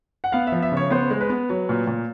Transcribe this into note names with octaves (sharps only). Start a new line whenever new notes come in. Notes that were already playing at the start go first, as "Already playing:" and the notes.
F#5
B3 F5
E5
F3
E5
C#3
C#5
B3 C5
G#3
B4
B3
F#3
A#2
A#2